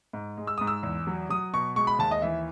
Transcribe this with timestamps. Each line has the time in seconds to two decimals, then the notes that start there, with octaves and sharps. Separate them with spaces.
0.13 G#2
0.38 G#3
0.47 E6
0.58 G#2 D#6
0.67 E6
0.83 E2
1.07 F#3
1.29 F#3 D#6
1.53 B2 C#6
1.76 G#3 C#6
1.87 B5
1.99 D#2 A5
2.11 D#5
2.22 E3 E5